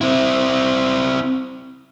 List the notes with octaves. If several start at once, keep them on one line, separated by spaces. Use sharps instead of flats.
C4 E4